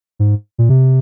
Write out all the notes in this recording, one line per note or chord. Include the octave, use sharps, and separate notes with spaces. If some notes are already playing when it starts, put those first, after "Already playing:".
G#2
A#2
C3